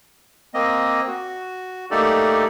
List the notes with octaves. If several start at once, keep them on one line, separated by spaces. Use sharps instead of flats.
A#3 C4 D#5
F#4
A3 A#3 D#4 G4 A4 D5